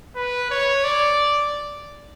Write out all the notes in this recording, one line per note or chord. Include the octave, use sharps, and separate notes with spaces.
B4
C#5
D5